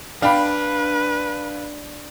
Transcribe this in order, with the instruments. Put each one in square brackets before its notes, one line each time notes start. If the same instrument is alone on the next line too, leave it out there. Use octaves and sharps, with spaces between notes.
[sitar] D4 [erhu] B4 [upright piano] F5 G5 B5